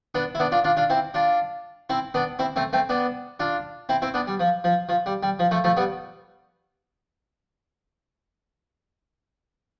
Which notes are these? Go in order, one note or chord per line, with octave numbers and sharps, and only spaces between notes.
B3 D4
E4
B3 D4
D4 F4
D4 F4
D4 F4
C4 E4
D4 F4
C4 E4
B3 D4
C4 E4
A3 C4
A3 C4
B3 D4
D4 F4
C4 E4
C4 E4
B3 D4
G3
F3
F3
F3
G3
G3
F3
F3 A3
F3 A3
G3 B3